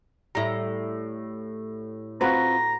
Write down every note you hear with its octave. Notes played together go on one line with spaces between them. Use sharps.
A2 G3 E4 A#5
C4 F4 F#4 B4 C5 A#5